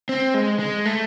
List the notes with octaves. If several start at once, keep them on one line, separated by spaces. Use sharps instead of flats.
C4
G#3
G#3
A3